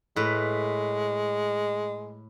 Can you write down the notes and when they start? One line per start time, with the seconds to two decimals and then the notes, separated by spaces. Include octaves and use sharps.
0.16 A2 G#3 B4